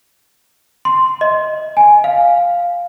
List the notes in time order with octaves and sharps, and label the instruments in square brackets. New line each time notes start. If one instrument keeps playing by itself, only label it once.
[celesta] C6
D#5
G#5
F5